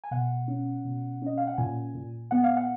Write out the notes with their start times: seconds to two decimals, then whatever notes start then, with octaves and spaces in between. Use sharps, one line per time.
0.04 G#5
0.11 B2 F#5
0.48 C#4
0.85 B2
1.22 C#4 D#5
1.38 F5
1.47 F#5
1.58 A#2 G#5
1.95 A#2
2.31 B3 F#5
2.44 F5
2.57 F#5